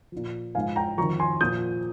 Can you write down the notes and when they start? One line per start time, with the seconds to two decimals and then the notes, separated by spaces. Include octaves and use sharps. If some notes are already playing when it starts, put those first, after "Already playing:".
0.12 A#2 F3
0.55 G#2 F3 F5 G#5
0.76 G5 A#5
0.98 F2 D#3 A#5 C#6
1.20 G#5 C6
1.41 A#2 F3 D#6 G6